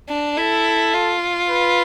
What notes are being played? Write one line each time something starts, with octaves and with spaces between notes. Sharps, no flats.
D4
E4 A4
F4
B4